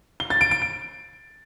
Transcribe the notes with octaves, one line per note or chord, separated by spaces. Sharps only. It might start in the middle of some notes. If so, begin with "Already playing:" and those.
G7
A6
D7
D7
D7